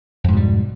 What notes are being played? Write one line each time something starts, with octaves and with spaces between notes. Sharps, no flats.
F2 G#2 B2 G3